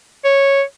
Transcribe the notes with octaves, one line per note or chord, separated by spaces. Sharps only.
C#5